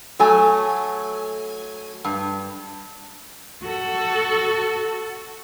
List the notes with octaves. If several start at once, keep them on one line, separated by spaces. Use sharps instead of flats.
F#3 A3 G#5
G2
F#4 A4